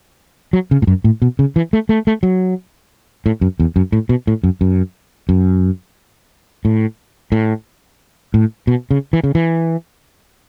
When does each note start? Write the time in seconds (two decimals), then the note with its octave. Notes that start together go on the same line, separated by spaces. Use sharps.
0.53 F#3
0.71 C#3
0.82 A2
0.87 F#2
1.04 A2
1.22 B2
1.39 C#3
1.56 E3
1.73 A3
1.89 A3
2.07 A3
2.23 F#3
3.26 A2
3.41 F#2
3.60 E2
3.76 F#2
3.92 A2
4.09 B2
4.27 A2
4.44 F#2
4.61 F#2
5.29 F#2
6.65 A2
7.32 A2
8.34 A2
8.67 B2
8.91 C#3
9.13 E3
9.24 C#3
9.35 E3